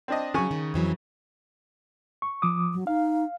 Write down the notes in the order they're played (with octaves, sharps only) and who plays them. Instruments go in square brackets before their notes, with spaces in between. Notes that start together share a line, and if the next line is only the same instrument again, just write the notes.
[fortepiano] C4 D4 D#5
[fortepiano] C#3 G#5 C#6 [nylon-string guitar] F3 F#3
[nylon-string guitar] D#3
F2 E3 F#3
[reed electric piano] C#6
F3 D6 D#6
[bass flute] F#3
[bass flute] D#4 [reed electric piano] F5